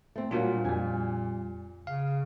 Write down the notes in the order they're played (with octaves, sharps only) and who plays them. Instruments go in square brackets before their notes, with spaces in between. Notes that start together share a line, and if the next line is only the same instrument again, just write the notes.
[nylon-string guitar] A3 C4
[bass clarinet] A#2 [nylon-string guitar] F#3 A#3 F#4 [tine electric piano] G3 D4 F4
[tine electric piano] F2 G3 [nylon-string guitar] G#5
[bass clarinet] C#3 [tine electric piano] F5